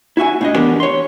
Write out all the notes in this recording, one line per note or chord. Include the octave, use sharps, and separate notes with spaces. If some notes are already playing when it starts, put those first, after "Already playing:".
E4 F#4 E5 G#5
A2 D4 D#5
E3 B3 D4 G4 A#4
C#5 C6